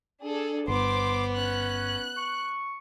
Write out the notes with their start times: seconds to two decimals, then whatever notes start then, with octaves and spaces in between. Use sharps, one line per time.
0.23 D4 G#4 A4
0.68 G1 B3 C5 C6 D6
1.37 C#4 F#6
2.17 C#6